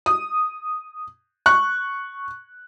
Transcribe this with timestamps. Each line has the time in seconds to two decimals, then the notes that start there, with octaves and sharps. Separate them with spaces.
0.06 D#6
1.46 C#6 F#6